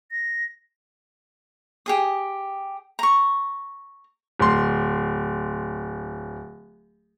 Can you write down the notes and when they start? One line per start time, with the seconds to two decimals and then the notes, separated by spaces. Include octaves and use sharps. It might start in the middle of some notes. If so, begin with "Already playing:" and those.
0.11 A#6
1.86 G4 G#4 D#6
2.99 A#5 C#6
4.39 D1 C6